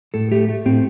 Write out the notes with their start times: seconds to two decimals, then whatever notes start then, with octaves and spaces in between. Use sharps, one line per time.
0.14 A2 A4
0.32 A3 G4
0.49 A3
0.66 A2 C4